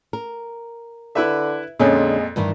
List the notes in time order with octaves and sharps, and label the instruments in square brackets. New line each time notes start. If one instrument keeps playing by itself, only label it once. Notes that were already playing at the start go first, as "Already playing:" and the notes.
[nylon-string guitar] A#4
[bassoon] D3 [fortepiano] E4 B4 E5
[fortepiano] F2 A#2 [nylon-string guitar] D3 C#4 [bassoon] G#3
[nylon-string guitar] G2 D#3 E3